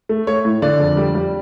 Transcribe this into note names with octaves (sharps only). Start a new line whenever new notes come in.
A3
A3 C#5
A2
D3 D5
F2
G3
G3